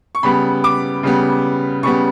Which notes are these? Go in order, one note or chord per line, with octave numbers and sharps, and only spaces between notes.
C#6
C#3 G3 B3 B5
D6
C#3 G3 B3
C#3 G3 B3 C#6